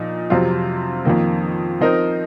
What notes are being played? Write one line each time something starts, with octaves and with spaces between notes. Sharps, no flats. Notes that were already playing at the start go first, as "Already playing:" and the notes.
Already playing: A#2 F3 D#4
F2 C3 F#3 C4 F4
F2 D#3 A#3
F3 C4 D#4 A#4